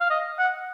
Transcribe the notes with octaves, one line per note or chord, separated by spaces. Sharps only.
F5
D#5
F#5